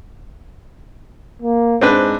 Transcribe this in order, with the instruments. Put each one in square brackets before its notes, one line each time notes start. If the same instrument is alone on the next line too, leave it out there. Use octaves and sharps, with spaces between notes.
[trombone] A#3
[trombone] G#2 [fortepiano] C4 D4 B4